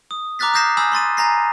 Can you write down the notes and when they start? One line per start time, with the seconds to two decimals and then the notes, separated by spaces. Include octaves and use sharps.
0.11 D#6
0.39 A#5 D6 F6 F#6 A6 B6
0.54 D#6 F6 G6 A#6 C7 E7
0.77 G#5 B5 D#6 E6 G6
0.92 B5 C6 A6 D#7
1.17 G#5 A#5 A#6 C7